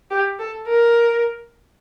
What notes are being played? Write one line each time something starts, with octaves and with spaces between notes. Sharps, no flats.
G4
A4
A#4